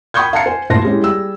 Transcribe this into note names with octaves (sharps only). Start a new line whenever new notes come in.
G5 B5 C#6 D#6 G6 G#6
F5 F#5 A5 A#5 C7 C#7
C5 F#5 G#5
D#1 A2 C5 A5 C6 A#6
G#3 C#4 E4 G4
G3 G#4 E6